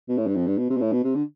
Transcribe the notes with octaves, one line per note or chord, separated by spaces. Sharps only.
B2
A2
G2
F2
G2
B2
C3
B2
A2
B2
C3
D3